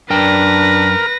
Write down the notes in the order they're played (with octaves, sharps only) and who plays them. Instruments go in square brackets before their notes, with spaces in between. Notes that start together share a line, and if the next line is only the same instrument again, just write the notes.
[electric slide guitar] F#2 D5 G5 [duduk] D4 [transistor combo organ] A#4 [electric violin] B4 A#6